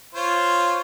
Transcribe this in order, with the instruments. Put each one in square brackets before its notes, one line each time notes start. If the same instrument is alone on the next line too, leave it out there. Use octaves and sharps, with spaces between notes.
[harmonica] F4 C5 C#5